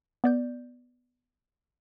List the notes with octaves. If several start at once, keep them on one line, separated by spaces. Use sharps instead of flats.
B3 D5 G6